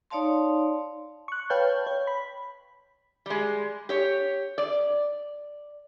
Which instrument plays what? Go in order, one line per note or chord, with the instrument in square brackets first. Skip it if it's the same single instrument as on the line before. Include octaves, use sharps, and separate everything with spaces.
[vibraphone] D#4 C#5 D5 F5 A5 C6
[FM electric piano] C#6 F#6
B4 C#5 F5 G5 A5 G6
C#5
B5
[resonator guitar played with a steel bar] G3 G#3
G4 C#5
D5